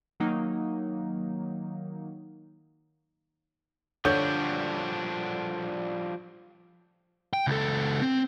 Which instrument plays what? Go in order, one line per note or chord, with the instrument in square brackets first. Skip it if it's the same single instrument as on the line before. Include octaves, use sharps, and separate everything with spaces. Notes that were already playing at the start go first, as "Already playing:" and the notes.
[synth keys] D#3 F#3 A#3 D#4
[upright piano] D3 C#5 G6 [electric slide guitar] F3 G3 D4
[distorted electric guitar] G5
C#2 A4
C4